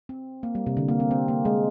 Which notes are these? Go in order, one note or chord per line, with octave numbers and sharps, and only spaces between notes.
C4
A#3
G3
C3
D3
A#3
C4
C4
A#3
G#3